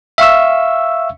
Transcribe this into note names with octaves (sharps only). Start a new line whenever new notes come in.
E5 F5 C#6 E6